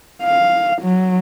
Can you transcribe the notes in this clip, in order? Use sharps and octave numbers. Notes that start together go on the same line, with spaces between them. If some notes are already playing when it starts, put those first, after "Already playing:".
F5
F#3